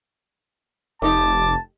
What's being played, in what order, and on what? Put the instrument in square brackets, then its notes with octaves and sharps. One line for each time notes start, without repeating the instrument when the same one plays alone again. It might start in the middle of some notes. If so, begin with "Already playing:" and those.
[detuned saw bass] F1 [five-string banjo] A3 D#4 G4 [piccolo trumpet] A5 [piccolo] D6